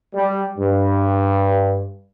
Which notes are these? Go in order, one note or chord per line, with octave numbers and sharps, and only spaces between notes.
G3
G2